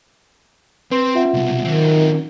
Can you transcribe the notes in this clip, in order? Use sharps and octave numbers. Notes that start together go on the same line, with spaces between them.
C4 B4 C6
F4 E5 F#5
C2 B2
D#3 F#3 C4